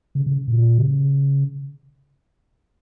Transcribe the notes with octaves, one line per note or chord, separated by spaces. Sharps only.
C#3
C#3
A#2
C#3